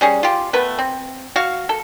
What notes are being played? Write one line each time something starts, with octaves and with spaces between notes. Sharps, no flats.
G3 C#4 G#4
F4 G4
A3 B3 B4
C4
F#4 F5
A4